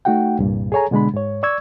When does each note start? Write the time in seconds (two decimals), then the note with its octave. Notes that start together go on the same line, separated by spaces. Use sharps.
0.05 A3 D#4 F#4 F#5 G5
0.39 C2 G2 A#2
0.72 G#4 A4 C#5 G#5 A#5
0.91 B2 D3 G#3 D4 B5
1.14 G#2 C#5
1.43 D5 C#6 E6 G#6